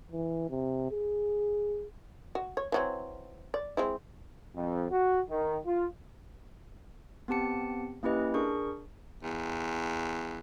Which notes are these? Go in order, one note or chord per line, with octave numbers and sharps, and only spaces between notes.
E3
C3
G#4
F#4
C#5
E3 F#3 C4
D5
G#3 C4 E4
F2
F#4
D#3
F4
B3 C4 G4 A5 C#7
A#3 C#4 E4 G4 B4 D#5
D4 G#4 A#4 C#6
E2